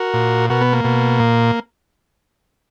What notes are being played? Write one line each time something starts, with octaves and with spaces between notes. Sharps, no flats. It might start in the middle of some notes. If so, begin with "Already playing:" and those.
Already playing: F#4 A#4
A#2
B2 F#4 A#4
B3
A#3
B2
A#2